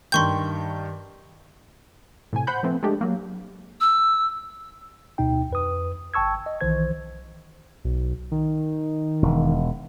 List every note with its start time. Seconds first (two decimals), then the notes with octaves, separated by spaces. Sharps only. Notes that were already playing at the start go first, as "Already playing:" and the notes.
0.12 G2 D#3 G5 C6 C#6 G6
2.33 A2 C3 G#5
2.47 C5 F#5 B5 G6
2.63 F3 A3 B3 C4
2.83 G#3 A3 D4 G4
3.01 F#3 A#3
3.81 E6
5.18 D2 B2 D#4 G5
5.50 F2 B4 D#6
6.14 G1 G5 A5 C#6 E6 G#6
6.46 D#5
6.61 B1 D#3 E3 C5 G#6
7.85 B1
8.32 D#3
9.22 E1